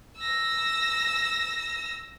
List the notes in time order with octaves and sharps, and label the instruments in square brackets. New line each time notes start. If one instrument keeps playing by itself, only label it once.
[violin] E6 A#6